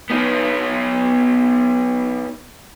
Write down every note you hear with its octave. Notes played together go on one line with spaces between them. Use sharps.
B3 D#4